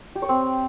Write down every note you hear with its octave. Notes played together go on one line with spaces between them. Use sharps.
G4
C#5
C4